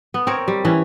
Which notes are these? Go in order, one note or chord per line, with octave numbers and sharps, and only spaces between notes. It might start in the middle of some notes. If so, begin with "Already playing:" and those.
B3
C4 A#4 C#5
G3
E3 C#4